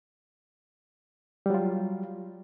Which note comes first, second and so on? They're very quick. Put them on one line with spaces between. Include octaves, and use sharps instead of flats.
G3 F#3 F4